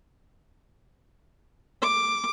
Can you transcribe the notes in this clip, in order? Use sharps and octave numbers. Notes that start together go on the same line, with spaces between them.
D6